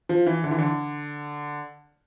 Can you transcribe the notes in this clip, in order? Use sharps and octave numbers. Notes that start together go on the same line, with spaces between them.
F3
E3
D3
E3
D3